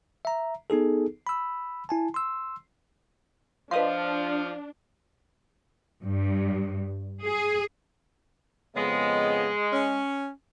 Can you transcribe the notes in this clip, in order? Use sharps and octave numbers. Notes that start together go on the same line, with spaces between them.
E5 A#5
B3 D#4 G#4 A4
B5 E6
E4 G#5 A5
C6 E6
F3 D4 B4 D#5 F5 C6
G2
G#4
F2 C#3 G#3 B3
C#4